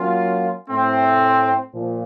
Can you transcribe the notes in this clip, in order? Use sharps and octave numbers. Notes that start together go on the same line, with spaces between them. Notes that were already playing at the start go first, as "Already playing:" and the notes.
Already playing: F#3 A#3 C#4 F4
A2 A3 C4
A#2 F3